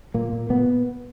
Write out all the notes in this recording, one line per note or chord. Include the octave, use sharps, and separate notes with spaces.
A#2 A#3
A#2
A#2 B3